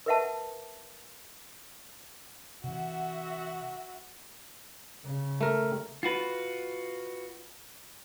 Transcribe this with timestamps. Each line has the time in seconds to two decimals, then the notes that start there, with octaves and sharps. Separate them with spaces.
0.06 A#4 B4 E5 F#5 A5
2.64 C3 E3 F#4 E5 F#5
5.05 C#3
5.41 A3 A#4
6.03 F4 F#4 B4